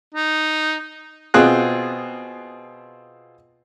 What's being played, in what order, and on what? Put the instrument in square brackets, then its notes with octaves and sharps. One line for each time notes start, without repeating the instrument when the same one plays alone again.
[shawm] D#4
[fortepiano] B2 C4 F4 G#4 F#6